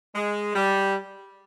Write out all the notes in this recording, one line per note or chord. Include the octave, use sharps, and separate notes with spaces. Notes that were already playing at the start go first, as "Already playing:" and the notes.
G#3
G3